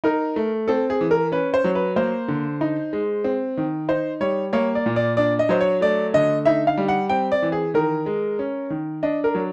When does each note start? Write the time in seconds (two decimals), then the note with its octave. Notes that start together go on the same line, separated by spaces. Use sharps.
0.04 D#4 A#4
0.36 A3
0.68 C4 A4
0.90 G#4
1.01 E3
1.11 A#4
1.32 C#4 B4
1.54 C5
1.64 F#3
1.75 B4
1.96 A#3 C5
2.28 D3
2.61 D#4
2.93 G#3
3.24 C4
3.57 D#3
3.89 D#4 C5
4.21 G3 C#5
4.53 A#3 C#5
4.75 D5
4.86 A#2
4.96 D5
5.17 D4 D5
5.39 D#5
5.49 F#3 C5
5.61 C#5
5.81 A3 D5
6.14 D3 D#5
6.45 D#4 E5
6.67 F5
6.78 G3
6.88 F#5
7.09 C4 G5
7.32 D5
7.42 E3
7.52 G#4
7.74 D#3 A#4
8.06 G#3
8.39 C#4
8.70 D#3
9.03 D4 D#5
9.24 A#4
9.35 F#3